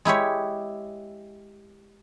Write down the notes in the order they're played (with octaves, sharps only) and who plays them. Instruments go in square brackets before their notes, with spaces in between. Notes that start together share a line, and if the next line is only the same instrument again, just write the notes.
[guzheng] G#3 E4 G4 C#5